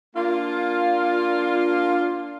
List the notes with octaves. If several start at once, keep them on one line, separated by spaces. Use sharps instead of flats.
A#3 D4 F4